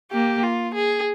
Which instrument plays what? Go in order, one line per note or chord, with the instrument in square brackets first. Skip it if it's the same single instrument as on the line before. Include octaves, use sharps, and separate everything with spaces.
[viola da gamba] A#3 [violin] G4
[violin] F4
G#4